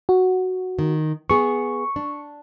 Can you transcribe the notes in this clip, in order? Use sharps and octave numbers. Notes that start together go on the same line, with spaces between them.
F#4
D#3
B3 G#4 C#6
D4